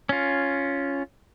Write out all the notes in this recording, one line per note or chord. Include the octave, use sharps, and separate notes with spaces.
C#4 F4